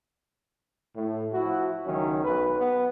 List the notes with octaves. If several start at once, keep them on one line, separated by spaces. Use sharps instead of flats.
A2
F3 E4 F#4
C#2 D#3 F#3 C#4
B1 B4
B3